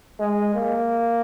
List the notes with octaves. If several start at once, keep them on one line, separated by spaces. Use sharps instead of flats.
G#3
A#3